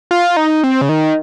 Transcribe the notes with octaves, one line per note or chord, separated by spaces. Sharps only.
F4
D#4
C4
C#3
D#3